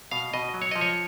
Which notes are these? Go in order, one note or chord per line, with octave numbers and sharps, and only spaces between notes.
B2 F5
B2 D#5
F#3
C#5
F3 D#5
C#5